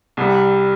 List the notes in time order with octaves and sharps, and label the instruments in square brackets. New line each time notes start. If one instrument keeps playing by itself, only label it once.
[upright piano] C2 C3 G3